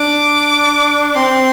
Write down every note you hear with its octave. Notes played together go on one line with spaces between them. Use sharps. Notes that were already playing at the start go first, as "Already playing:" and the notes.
Already playing: D4 D6
C4 C6